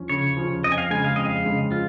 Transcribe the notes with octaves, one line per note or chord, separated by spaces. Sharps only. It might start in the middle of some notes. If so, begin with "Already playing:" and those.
Already playing: F3 C#4
C#3 C#5
F3 C#4
F2 D#5
G#5
F5
C#3 G#3 G#5
F5
F2 D#5
F5
C#3 G#3
F3 F4